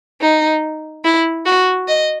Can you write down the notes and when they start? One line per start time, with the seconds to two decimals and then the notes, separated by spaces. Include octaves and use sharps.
0.21 D#4
1.05 E4
1.46 F#4
1.88 D#5